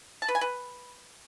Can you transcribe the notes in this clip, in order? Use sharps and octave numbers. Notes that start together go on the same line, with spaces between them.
A5
B4
G#5
B4